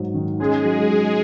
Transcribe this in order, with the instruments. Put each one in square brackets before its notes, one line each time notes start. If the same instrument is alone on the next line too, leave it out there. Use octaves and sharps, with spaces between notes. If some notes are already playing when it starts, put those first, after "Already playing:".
Already playing: [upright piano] G#2 F#3
D#3
[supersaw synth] G#3 G#4 [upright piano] C#4
[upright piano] F#3
F#3